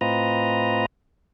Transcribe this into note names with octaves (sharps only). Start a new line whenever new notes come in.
A2 C4 F4 B4 D#5 A#5